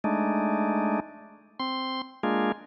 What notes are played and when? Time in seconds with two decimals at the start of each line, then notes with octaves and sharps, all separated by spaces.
0.04 G#3 A3 D4 D#4
1.60 C4 C6
2.23 G#3 A#3 D4 F4 G#4